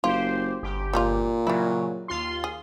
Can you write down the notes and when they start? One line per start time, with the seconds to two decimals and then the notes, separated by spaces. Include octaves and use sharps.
0.04 F#1 F4 G4 C5
0.63 G1 G4
0.93 A#2 G3 G#3 F4
1.47 C#3 F#3 G3 E4
2.08 D#2 F4 C6
2.44 G#4